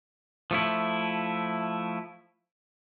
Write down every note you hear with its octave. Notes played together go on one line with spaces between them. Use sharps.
F3 A3 E4